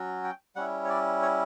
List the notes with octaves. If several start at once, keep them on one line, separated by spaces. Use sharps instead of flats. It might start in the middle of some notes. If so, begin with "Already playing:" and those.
Already playing: F#3 C#4 F#4
G5
G3 C#4 E4 F#5
C#5
D5
C#5